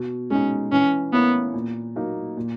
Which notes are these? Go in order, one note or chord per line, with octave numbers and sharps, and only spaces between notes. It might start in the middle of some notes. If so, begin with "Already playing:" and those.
Already playing: B2
G#3 C#4 D#4
E3 C#4
A#3 B3 C#4 E4
A#2
F#3 A#3 D#4
A#2